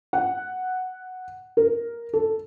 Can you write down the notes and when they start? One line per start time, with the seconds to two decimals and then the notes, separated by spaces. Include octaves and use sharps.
0.13 F#5
1.57 A#4
2.13 A4